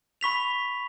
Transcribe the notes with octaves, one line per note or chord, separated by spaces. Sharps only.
B5 C#6 B6 F7